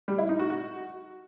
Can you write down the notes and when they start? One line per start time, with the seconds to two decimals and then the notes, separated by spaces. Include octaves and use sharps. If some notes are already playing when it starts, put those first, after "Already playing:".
0.08 G3
0.18 E4
0.29 D#4
0.39 F#4
0.50 F#4